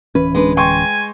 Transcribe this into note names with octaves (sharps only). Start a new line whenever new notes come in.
D1 E3 C#4 B4
G#3 D4 B4
G#3 G5 G#5 C6 C#6